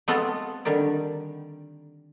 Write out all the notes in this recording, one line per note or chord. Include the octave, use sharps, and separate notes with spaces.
G#3 B3 C4 F4 F#4 A4
D3 D#3 G3 D5